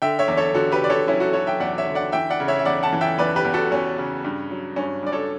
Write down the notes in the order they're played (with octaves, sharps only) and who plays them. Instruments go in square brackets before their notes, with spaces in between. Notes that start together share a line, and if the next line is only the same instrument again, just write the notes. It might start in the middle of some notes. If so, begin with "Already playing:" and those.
[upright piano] D3 E5 G5
C#5 E5
E2
A4 C#5
D3 F#4 A4
G4 B4
D3 D5
A4 C#5
F#3 C#4 E4
F#4 A4
F#3 A4 C#5
E5 G5
E2 D5 F#5
C#5 E5
D3
D5 F#5
E3 E5 G5
D5 F#5
C#3
C#5 E5
E5
E2 D5 F#5
F#5 A5
E3
E5 G5
E2 B4 D5
G4 B4
E2
F#4 A4
E2 C#4
C#3
G2
F#3
G2 C#4
G2 D5
A4 C#5